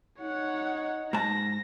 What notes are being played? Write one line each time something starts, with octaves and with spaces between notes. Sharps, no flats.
D#4 C#5 F#5
G#2 A5 A#6